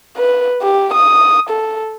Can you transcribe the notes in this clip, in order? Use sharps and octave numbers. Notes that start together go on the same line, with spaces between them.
B4
G4
D#6
A4